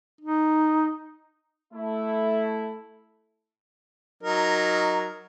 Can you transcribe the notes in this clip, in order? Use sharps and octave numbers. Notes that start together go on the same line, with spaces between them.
D#4
A3 E4
F#3 D#4 A#4